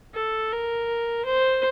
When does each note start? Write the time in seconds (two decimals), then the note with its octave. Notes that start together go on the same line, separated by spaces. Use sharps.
0.14 A4
0.51 A#4
1.25 C5